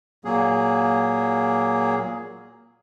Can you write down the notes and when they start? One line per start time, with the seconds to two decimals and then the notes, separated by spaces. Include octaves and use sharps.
0.25 A#2 F#3 A#3 G#4